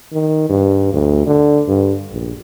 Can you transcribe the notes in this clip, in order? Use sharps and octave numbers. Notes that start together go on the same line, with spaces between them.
D#3
G2
D2
D3
G2
A#1